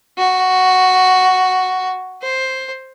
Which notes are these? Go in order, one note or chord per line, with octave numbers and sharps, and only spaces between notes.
F#4
C5